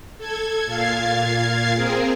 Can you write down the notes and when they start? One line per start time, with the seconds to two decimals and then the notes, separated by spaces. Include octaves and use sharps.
0.18 A4 G#6
0.66 A#2 F5 G#6 A6 C7
1.73 C4 G#4 A#4